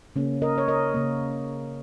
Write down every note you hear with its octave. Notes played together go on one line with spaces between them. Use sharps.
C#3 A#3 C#4
A#4 D#5
C#5
A#4 D#5
C#3 A#3